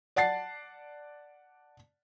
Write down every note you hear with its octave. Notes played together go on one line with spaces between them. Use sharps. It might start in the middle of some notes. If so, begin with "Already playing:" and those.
D5 F#5 A5 A6 C7